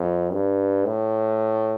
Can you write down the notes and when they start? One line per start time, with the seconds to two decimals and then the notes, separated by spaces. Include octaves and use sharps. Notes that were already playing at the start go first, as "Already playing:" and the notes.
Already playing: F2
0.32 G2
0.86 A2